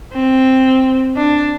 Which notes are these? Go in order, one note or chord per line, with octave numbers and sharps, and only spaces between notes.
C4
D4